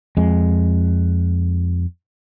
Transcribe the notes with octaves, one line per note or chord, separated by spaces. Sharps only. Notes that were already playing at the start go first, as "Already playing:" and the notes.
F2 G#3